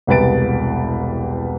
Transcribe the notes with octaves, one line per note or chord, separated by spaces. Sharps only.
E1 C2 G4 B4 A6 D7